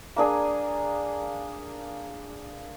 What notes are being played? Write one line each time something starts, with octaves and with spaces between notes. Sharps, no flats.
A#3 D4 G#4